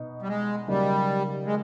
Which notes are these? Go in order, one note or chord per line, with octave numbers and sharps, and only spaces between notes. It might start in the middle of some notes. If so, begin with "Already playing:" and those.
Already playing: B2 B3 D#4
G3
G#3
C#3 F#3 G3 A#3 D#4
G#3